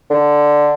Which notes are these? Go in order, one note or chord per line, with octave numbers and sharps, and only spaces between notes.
D3